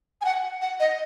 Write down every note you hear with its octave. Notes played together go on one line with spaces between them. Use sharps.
G#5
F#5
F#5
D#5